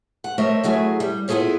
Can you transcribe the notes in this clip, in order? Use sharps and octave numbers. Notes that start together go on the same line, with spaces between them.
F#5
A3 C4 A#4 C#5 D#5 E5
E3 F#3 A3 G#4
G3
B3 E4 F4 G#4 A4 C#5